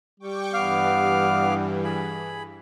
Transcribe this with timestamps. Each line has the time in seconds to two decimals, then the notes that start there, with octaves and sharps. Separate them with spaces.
0.20 G3 G5 C#6 D6
0.54 G2 E3 B3 F5 D6 F6
1.84 G#4 B5